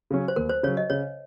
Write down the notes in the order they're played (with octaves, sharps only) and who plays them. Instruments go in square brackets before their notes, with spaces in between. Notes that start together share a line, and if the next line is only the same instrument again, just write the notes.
[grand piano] C#3 F#3 C#4
[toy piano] C5
[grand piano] D#2 [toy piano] A#4
[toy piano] C5
[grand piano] C#3 F#3 [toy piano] C#5
[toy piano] D#5
[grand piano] C#3 [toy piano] C#5